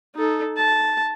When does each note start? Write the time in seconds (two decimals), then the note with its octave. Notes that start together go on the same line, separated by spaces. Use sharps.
0.16 D#4 A4
0.57 A5